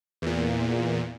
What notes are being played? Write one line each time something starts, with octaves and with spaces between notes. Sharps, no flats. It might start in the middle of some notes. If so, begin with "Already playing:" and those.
E2 A#2